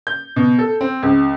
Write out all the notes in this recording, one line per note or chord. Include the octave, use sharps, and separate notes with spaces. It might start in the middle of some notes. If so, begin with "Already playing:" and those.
G6
B2
A4
C4
C#2